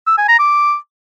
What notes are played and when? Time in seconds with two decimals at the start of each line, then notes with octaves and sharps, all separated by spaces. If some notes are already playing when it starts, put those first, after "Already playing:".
0.07 E6
0.18 G#5
0.28 A#5
0.39 D6